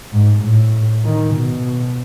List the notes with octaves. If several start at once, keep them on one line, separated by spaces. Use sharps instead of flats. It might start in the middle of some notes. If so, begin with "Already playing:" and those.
G#2
A2
D#3
B2